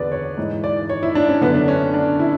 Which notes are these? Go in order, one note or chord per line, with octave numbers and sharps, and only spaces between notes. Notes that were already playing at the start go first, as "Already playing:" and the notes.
Already playing: E2 D3 G#4 B4 D5
C#5
G#2 E3
D5
C#5
E4
D4
C#4
F#2 D3 B3
D4
C#4
D4
E4